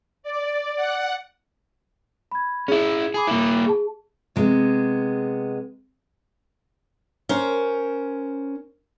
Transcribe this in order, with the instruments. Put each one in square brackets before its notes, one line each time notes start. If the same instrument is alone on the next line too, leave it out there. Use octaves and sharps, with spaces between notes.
[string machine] D5
F#5
[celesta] B5 G#6
[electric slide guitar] C#4 E4 [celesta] G#4
[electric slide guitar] G#4 [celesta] A5 B5 D6
[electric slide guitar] A#3 E4
[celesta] G#4 A5
[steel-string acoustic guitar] C3 G#3 B3
C#4 A#4 C5